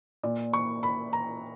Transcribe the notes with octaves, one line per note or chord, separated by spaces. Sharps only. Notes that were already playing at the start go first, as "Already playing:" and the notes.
A#2 D5
C#6
B5
A#5